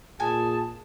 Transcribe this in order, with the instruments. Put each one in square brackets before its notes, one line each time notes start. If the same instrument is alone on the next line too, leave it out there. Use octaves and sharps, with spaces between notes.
[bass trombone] A#2 [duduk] G#4 [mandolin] G#5 [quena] A5